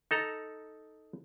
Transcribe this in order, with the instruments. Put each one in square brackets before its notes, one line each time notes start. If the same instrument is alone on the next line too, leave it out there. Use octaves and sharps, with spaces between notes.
[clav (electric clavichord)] D#4 A4 A#5